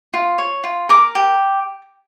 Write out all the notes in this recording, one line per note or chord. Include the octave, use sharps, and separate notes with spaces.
F4
C#5
F4
A#4 D6
G4